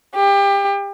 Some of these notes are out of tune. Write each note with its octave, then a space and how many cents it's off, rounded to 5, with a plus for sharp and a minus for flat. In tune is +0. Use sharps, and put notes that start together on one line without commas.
G4 +25